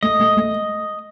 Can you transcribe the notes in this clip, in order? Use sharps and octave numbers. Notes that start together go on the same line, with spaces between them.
A3 D#5
A3
A3